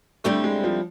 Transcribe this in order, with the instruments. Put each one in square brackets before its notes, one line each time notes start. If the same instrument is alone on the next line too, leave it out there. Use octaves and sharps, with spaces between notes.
[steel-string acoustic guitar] D2 D3 G3 C4 E4 [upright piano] A3
[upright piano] G#3
F3